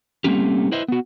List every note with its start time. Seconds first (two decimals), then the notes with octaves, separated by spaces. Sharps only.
0.24 G3 A3 A#3 C4 C#4 G4
0.72 E4 B4 C5 D#5 E5
0.88 B3 F#4